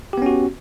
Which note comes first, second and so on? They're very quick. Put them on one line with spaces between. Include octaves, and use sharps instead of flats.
G4 B3 C#4 F#4